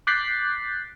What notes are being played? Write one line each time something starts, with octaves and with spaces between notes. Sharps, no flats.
D6 F#6 G6 A6 B6 C7